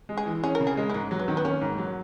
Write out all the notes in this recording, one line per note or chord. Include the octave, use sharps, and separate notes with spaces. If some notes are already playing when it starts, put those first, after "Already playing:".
G#3
G#4
E3
C#4 G#4
A#4
C#3
G#4
G#3
E4
G#2 D#4
F#3
B3
D#3
B3
A#3 C#4
G#2
F#3